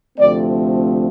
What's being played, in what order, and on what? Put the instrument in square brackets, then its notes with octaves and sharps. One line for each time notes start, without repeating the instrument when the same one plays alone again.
[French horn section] D2 C3 F3 A3 C4 D5